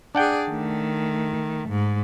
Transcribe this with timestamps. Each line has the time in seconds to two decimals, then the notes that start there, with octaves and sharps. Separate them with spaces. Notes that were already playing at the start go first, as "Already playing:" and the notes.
0.15 D4 G#4 D5 F#5 G5
0.49 D#3 A3
1.69 G#2